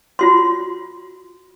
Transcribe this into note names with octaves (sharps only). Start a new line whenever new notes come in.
F4 F#4 C6